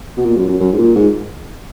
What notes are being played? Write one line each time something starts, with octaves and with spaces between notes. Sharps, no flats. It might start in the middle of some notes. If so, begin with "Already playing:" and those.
B2
A#2
F#2
F#2
F#2
G#2
A#2
G#2